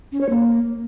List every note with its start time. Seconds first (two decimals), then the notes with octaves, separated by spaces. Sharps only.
0.12 C#4
0.21 C#5
0.29 A#3